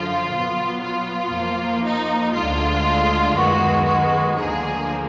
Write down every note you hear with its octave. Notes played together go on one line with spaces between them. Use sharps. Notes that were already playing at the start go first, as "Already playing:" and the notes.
Already playing: F#2 D3 F3 F4
B2 F#3 B3
F4
F2 F3 A#3
D#4
D2 D3 G#3 F4
F#2 D#3 G#3 B3 F#4
F#4
D2 D3 F3 A#3 G#4